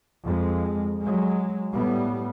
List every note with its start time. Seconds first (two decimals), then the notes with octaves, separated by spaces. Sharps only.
0.24 F2 G#3
1.01 F#3 G#3
1.73 A2 G3 B3